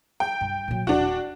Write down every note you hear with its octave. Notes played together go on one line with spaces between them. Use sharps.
G5
G2
A#2 F#3
D#1 D4 F#4